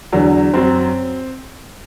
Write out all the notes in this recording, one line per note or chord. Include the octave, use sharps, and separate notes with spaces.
E2 D3 F#3
F#2 F#3 C4